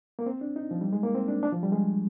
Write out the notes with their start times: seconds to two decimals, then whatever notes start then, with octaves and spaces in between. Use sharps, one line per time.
0.19 A#3
0.26 C4
0.41 D4
0.56 D#4
0.71 F3
0.81 G3
0.93 G#3
1.03 A#3
1.15 C4
1.28 D4
1.43 D4
1.52 F3
1.63 G3
1.72 G#3